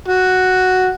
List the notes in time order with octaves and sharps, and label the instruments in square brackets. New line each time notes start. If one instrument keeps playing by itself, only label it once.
[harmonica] F#4